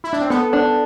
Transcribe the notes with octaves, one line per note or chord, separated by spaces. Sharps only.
E4
D4
C4
B3 A4
D4